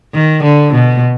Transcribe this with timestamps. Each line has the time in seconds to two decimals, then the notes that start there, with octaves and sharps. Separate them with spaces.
0.14 D#3
0.43 D3
0.74 B2